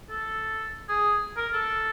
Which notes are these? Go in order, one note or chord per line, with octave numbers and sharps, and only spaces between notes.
A4
G#4
A#4
A4